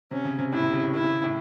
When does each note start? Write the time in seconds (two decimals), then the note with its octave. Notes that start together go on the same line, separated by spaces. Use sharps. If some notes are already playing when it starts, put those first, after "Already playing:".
0.11 C3 C#4
0.25 C#3
0.39 C3
0.52 A2 E4
0.63 C3
0.73 C#3
0.83 C#3
0.94 D#3 E4
1.04 C#3
1.24 A2